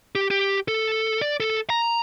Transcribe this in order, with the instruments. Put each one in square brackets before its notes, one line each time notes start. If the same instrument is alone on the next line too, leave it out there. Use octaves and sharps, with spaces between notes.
[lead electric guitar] G4
G4
A4
D5
A4
A#5